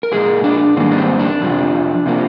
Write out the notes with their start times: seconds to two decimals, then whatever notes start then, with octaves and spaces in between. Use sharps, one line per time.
0.03 A#4
0.12 A#2 F3 G#3 G#4
0.44 D4
0.77 G#2 D#3 G3 A#3 C4
0.91 D4
0.98 C4
1.19 D4
1.41 F2 C3 F3
2.06 C3 F3 A#3